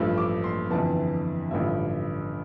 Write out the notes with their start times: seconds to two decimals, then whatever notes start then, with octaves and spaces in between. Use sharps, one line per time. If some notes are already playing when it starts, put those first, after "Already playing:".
Already playing: A1 G2 F3 A3 E6
0.18 D6
0.44 C6
0.71 G1 F2 E3 A5
1.51 A1 G2 D3 F3 E5